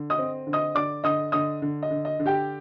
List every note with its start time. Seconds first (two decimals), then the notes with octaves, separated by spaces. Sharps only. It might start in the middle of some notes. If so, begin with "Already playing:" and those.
Already playing: D3
0.10 D#5 D#6
0.18 C4
0.47 D3
0.53 D#5 D#6
0.75 D3 D5 D6
1.04 D3 D#5 D#6
1.32 D3 D#5 D#6
1.62 D3
1.83 D#5
1.91 D3
2.05 D#5
2.19 D3
2.26 G4 G5